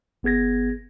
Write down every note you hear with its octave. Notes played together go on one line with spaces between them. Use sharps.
G1 B3 G#4 G#6 A#6